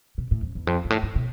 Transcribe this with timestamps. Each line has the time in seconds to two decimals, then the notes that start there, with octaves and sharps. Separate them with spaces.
0.18 B2
0.31 A2
0.42 F2
0.55 E2
0.67 F2
0.85 G#2
0.90 A2
1.03 G#2
1.16 B2